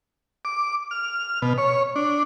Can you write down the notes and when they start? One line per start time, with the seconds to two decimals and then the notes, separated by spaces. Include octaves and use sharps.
0.45 D6
0.91 F6
1.42 B2
1.58 C#5
1.96 D4